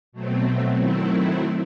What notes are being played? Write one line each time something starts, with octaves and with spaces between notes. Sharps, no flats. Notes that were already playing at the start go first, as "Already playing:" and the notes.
B2 F#3 A3 C4
D#3 F#3 A3 C4 E4